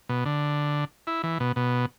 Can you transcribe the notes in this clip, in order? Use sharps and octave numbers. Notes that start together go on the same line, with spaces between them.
B2
D3
E4
E3
B2
B2